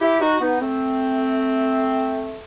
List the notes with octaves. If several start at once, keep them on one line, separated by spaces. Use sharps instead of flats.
E4 G4
D#4 F#4
B3 D#4
A3 C4